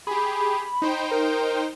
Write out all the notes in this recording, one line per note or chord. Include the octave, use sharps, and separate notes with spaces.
G4 G#4 B5
D#4 C5 G5
A#4